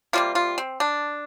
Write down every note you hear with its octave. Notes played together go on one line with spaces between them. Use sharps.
C3 G3 A#3 F4
F4
C4
D4